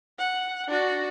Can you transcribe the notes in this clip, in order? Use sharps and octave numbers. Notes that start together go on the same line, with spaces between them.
F#5
D4 F#4